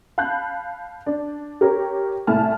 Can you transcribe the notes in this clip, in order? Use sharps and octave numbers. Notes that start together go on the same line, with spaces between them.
F5 A5 B5 F#6 G6
D4
G4 A#4 C#5
C2 A2 A3 G#5 A5 F6